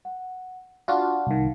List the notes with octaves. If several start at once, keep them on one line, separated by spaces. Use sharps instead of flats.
F#5
D4 F4 F#4 F5 F#5 A5
C2 D#3